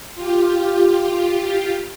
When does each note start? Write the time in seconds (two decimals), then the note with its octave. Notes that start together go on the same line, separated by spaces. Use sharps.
0.15 F4 G4